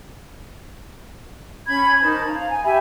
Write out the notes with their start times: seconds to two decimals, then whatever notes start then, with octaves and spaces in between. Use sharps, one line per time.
1.67 C#4 B5 G#6
2.01 D#4 A#4 C5 A5
2.28 F5 A#5
2.49 G#5
2.64 G4 E5 G#5 B5